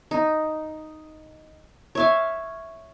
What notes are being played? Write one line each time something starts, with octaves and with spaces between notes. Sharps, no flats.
D#4
C#5 E5 F5